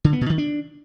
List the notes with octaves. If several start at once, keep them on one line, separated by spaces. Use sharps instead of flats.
D3
B3
B2
D#3
D4